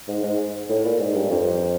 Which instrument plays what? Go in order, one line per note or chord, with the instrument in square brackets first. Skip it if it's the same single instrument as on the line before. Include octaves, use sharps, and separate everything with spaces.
[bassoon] G#2
G#2
A2
A#2
G#2
G2
F2